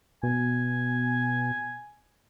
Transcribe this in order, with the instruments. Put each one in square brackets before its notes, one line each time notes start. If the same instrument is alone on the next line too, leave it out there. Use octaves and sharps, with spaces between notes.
[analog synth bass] B2 [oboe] G#5